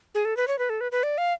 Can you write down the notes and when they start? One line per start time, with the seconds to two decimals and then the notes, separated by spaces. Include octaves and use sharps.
0.15 G#4
0.25 A4
0.37 B4
0.48 C#5
0.59 B4
0.70 A4
0.81 B4
0.92 B4
1.03 D5
1.18 F5